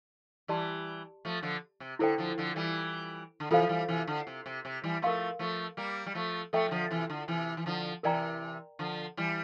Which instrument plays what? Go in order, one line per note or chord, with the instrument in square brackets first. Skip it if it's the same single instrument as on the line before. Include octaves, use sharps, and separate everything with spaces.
[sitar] E3 G3 [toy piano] G4 D5 A5 C6
[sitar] F3 A3
D3 F3
C3
[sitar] D3 [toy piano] E4 A4 C5 G5
[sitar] D3 F3
D3 F3
E3 G3
D3
[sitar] C3 E3 [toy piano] F4 A4 C5 F5
[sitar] F3
E3 G3
C3 E3
D3
C3
C3
C3
E3 G3
[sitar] F3 A3 [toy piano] A#4 F5 C6
[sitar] F3 A3
G3 A#3
G3
F3 A3
[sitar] F3 A3 [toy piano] A4 E5 G5
[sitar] G3
D3 F3
C3 E3
D3
C3 E3
E3
D3 F3
[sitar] C3 E3 [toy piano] A#4 D5 G5 A#5
[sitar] D3 F3
E3 G3